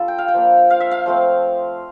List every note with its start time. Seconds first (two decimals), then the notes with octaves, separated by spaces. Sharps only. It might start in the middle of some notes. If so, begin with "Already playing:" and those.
Already playing: G3 D4 F4 A4
0.08 G5
0.18 F5
0.28 G5
0.34 F3 A#3 D4
0.70 F5
0.80 E5
0.91 F5
1.06 F3 A3 C4